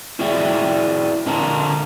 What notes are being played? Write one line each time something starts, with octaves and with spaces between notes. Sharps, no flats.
E4 F#4 G#4 D5 E5 G5
D3 D4 A#4 D#5 A5 A#5